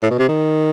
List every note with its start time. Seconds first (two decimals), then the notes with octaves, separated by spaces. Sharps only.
0.03 A2
0.11 B2
0.19 C3
0.28 D#3